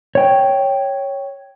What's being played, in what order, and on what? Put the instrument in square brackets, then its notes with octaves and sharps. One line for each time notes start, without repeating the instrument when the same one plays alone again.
[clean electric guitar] C#5 G5